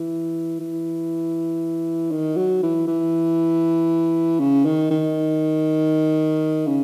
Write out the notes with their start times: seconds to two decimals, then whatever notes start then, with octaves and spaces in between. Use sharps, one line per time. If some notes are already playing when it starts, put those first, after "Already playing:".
Already playing: E3
0.60 E3
2.11 D#3
2.37 F#3
2.63 E3
2.87 E3
4.40 C#3
4.65 D#3
4.91 D#3
6.67 C#3